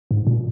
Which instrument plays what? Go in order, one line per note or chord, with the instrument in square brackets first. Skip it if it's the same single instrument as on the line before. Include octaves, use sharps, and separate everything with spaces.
[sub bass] G#2
A#2